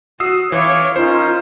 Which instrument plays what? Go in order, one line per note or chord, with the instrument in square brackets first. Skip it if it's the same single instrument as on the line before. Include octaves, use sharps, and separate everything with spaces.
[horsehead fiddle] F#4 [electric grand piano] D#6 E6 C7
[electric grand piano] E3 [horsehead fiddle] C#5 [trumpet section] F5 D6
[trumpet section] C#4 D#4 A#4 [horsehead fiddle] F4 [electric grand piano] C5